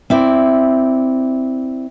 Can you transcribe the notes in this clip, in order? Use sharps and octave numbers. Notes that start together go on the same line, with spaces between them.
C4 E4 D5